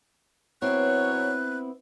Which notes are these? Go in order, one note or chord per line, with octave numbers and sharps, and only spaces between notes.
F#3 B3 C4 E4 C#5 F#6